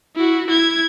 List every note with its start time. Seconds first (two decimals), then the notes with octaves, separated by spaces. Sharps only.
0.16 E4 F#4
0.47 E4 G#6